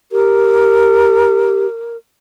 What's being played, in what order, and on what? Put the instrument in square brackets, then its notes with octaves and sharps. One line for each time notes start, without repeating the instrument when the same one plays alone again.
[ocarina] G4 [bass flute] A#4